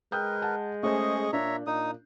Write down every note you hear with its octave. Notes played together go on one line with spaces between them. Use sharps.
G#3 A#4 B4 G5 D#6 G6
F#5 A5
A3 C#4 G#4 C5 D#5 C#6
A#2 D4 C#5 E5 A#5
A#2 D#4 D#6